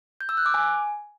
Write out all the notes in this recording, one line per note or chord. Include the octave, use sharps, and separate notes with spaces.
G6
E6
F#6
D6
G#5